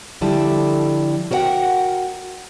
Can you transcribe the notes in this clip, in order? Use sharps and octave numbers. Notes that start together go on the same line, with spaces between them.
D3 F3 G3 E4 A4
F#4 A#4 C5 E5 F#5 G5